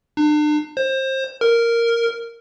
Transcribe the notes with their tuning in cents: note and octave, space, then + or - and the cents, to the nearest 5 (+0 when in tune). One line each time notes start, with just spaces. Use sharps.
D4 +40
C5 +25
A#4 -5